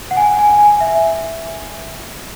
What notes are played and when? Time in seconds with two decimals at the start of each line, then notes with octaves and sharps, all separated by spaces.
0.11 F#5
0.17 G#5
0.39 G#5
0.59 G#5
0.81 E5